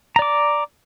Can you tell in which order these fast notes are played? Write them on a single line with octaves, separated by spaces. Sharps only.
A#5 D5 D6